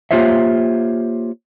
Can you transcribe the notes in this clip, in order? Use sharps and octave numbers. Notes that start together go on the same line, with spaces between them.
A#3 F4 G4 C5 C#5 E5